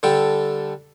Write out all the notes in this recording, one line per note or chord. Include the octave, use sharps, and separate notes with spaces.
D3 G3 A4 G5